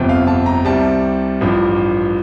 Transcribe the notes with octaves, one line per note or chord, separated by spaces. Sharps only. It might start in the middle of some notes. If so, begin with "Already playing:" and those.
Already playing: G1 F2 C3
F5
A5
A#5
C2 C3 G3 A5
A1 G2 F3